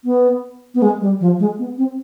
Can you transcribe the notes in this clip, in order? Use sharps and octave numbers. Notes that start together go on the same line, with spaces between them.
B3
B3
G#3
G3
F3
G#3
B3
C4